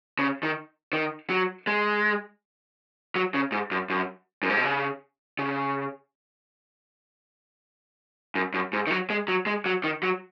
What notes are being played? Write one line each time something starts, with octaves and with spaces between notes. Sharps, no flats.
C#3
D#3
D#3
F#3
G#3
F#3
C#3
G#2
F#2
F#2
F#2
G#2
B2
C#3
C#3
F#2
F#2
G#2
D#3
F#3
G#3
F#3
G#3
F#3
D#3
F#3